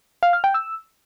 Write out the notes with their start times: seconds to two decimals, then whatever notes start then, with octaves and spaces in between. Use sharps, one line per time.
0.23 F5
0.33 F6
0.44 G5
0.54 E6